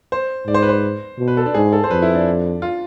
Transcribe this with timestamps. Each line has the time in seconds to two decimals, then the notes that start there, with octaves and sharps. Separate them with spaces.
0.12 C5
0.47 G#2 D5
0.54 C5
0.62 B4
0.69 C5
1.18 B2
1.28 B4
1.37 A4
1.46 D4
1.54 G#2 G#4
1.73 A4
1.84 C5
1.91 F2 B4
2.02 E4
2.15 D4
2.62 F4